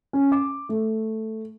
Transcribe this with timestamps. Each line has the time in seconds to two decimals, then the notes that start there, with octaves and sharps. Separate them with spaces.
0.13 C#4
0.32 D6
0.69 A3